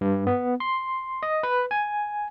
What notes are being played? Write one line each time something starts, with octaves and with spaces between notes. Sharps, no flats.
G2
B3
C6
D#5
B4
G#5